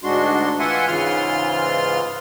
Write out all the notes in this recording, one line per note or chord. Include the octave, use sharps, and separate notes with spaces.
D2 G#2 G#3 D4 F#4 C6
E3 F4 E5 F#5 G#5 C6
G#2 C#3 E3 F4 C6 F6